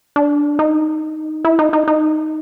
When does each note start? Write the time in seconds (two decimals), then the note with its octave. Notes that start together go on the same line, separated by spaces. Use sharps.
0.16 D4
0.59 D#4
1.45 E4
1.59 D#4
1.73 D#4
1.88 D#4